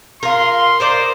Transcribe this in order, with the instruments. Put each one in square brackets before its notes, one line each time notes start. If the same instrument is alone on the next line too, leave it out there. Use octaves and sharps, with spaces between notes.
[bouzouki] F4 A#4 [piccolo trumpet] C6
[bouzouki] D#4 A#4 D5 [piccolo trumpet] C5